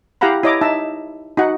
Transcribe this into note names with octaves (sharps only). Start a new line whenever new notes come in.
E4 G4 F5 F#5 A#5 B5
E4 C#5 D#5 A#5 D6
D#4 E5 A5
D#4 F#4 F#5